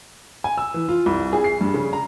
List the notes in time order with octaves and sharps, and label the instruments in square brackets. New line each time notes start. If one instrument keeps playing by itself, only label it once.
[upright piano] G#5
E6
E3
F4
C2
G#4
C7
G2
C#3
A#5